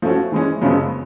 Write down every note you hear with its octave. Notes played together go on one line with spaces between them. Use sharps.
F3 A3 C#4 F#4
E3 G#3 C#4
F#2 C#3 F3 G#3 B3